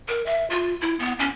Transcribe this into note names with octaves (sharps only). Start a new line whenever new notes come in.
A#4
E5
F4
E4
B3
C#4